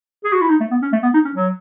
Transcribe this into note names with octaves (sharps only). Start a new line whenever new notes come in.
G#4
F#4
E4
D#4
A3
B3
C#4
A3
B3
D#4
C#4
F#3